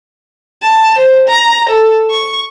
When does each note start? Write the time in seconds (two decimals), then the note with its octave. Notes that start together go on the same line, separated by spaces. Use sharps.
0.62 A5
0.98 C5
1.28 A#5
1.69 A4
2.10 C#6